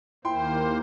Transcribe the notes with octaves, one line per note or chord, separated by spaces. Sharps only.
D#2 A#3 E4 C5 G5 C6